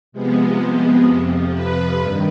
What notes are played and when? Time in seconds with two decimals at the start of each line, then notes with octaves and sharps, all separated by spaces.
0.12 C3 F3 G#3 B3
1.06 F2 C3 F3
1.52 B4
2.00 G2 D#3